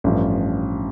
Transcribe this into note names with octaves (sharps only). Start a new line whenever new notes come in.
A1 G2 F3